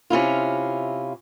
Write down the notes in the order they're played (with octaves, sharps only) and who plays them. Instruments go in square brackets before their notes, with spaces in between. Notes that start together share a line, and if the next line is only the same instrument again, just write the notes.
[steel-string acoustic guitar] C3 C#4 E4 F4